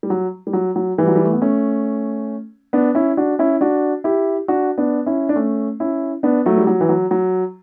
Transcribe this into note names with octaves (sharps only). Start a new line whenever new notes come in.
G3
F#3
G3
F#3
F#3
E3 G3
F#3
G3
A3
B3
A3 C#4
B3 D4
C#4 E4
D4 F#4
C#4 E4
D4 F#4
E4 G4
D4 F#4
B3 D4
C#4 E4
D4
A3 C#4
C#4 E4
B3 D4
F#3 A3
G3
F#3
E3
F#3
F#3